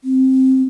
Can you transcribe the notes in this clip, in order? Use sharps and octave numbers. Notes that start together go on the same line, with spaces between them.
C4